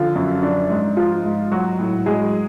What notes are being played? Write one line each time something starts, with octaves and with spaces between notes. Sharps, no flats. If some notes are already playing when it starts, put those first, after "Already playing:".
Already playing: D3 F3 F4
F#2
F3 D4
G#2
F3 F4
G#2
F#3 F#4
A2
F#3 G#3 G#4